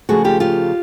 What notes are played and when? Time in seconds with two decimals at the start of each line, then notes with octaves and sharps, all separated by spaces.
0.09 C#3 F3 A3 F#4 G#4
0.24 F4 G4
0.40 F4 G4